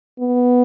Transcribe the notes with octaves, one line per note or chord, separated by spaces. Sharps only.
B3